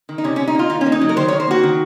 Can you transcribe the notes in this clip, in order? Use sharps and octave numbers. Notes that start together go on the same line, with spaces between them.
D#3
D#4
C3 C#4
C#4
C3
D#4
A#3 F4
D#3 D#4
C#4
A#3
D#4
F#3
A#4
D#3 C5
C#5
D#3
C5
A#3 F#4
D#3